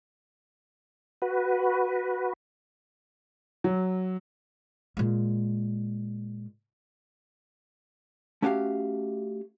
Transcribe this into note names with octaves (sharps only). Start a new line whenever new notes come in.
F#4 B4
F#3
A#2 G#3
A3 C#4 F#4 G4 E5 F5